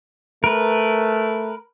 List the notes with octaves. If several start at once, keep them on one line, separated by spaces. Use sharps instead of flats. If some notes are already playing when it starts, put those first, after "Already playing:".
A3 A#4 B4